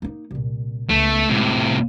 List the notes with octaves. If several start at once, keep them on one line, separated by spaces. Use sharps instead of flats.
A#3 D#4
C2 A#2
C#2 A3 B3
A2 C3 G#3
F1 B1